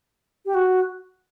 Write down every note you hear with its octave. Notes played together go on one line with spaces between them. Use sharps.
G4
F#4